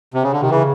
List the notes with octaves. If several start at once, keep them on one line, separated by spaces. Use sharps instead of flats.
C3
C#3
D3
C3 D#3
C#3 E3